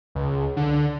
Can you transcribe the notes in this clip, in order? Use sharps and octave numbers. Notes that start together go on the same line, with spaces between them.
C#2
D3